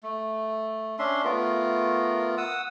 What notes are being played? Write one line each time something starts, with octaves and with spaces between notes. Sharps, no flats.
A3
C#4 D4 E5 C6
A3 B3 F4 A#4
F#5 D#6 E6